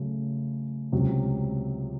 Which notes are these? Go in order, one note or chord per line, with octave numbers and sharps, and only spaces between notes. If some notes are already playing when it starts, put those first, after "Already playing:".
Already playing: C#3 F#3 A3
C#2 C3 F#3